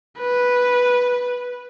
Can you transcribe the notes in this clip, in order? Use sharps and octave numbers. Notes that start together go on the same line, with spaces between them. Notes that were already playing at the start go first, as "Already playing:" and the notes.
B4